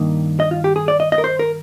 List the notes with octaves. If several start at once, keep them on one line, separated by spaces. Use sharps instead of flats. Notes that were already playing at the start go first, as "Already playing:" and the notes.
Already playing: G2 D#3 A#3 D#4
D#5
F4
G4
G#4
D5
D#5
D#5
A#4
C5
A#4